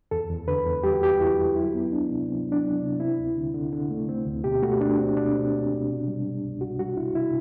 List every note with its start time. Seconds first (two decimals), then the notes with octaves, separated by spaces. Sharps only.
0.11 E2 A4
0.30 E2
0.48 D3 B4
0.66 E2
0.83 G3 G4
0.94 F#4
1.02 E2 G4
1.20 E2 E4
1.38 G3
1.56 F#3 E4
1.74 B3
1.92 D2 D4
2.10 C3
2.28 F#3 C4
2.46 F#3
2.52 D4
2.64 F#3
2.82 C3
3.00 C4 E4
3.18 D2
3.37 D3
3.54 D3
3.73 D3
3.90 A3
4.09 C4
4.26 D2
4.44 B2 G4
4.63 A3 F#4
4.80 A3 D4
4.99 C4
5.17 B2 D4
5.35 C4
5.53 C4
5.70 B2
5.89 C3
6.07 G3
6.25 G3
6.44 C2
6.61 C2 F#4
6.79 G3 F#4
6.97 C3 E4
7.15 C3 E4